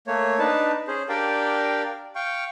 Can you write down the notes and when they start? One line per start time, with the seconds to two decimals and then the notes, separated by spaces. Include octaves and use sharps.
0.07 A3 A#3 C#5
0.39 D4 D#4 B4 A5
0.88 C#4 G#4 C5
1.09 D4 G4 A#4 D5 F5 G5
2.15 F5 G5 C#6